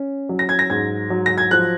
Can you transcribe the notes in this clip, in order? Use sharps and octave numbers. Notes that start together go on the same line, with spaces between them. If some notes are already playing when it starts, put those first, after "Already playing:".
Already playing: C#4
F#3
A#6
G#6
A#6
G#2 G#6
F#3
A#6
G#6
F3 F#6